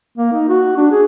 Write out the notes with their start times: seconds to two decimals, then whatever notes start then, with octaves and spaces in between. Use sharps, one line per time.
0.18 A#3
0.33 D#4
0.49 F#4
0.77 D4
0.91 G#4